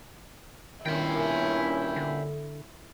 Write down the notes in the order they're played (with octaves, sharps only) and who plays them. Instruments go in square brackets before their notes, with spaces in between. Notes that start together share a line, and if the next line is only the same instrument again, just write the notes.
[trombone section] G2 A#2 C#4 [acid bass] D#3 [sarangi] E4 [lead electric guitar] E5 G5
[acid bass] D3